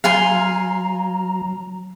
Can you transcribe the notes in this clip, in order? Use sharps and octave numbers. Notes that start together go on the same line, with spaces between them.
F#3 F5 G#5 A#5 C6